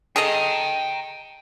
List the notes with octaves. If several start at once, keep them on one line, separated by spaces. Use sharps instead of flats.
G#4 A4 D#5 G5 A#5